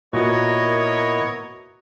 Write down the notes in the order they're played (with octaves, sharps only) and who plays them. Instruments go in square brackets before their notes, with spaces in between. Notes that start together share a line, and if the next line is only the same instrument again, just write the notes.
[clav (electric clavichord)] A#2 B4 [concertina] B3 E4 D#5 [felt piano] F#4 [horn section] A#4 C#5